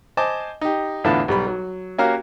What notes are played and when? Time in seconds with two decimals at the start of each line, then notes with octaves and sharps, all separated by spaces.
0.17 C5 D#5 G#5 A5 D6
0.61 D#4 G4
1.04 E2 A2 D3 B3 F4 A5
1.28 B1 G3 B5
1.47 F#3
1.98 A#3 C#4 F#4 G4 A#4 F5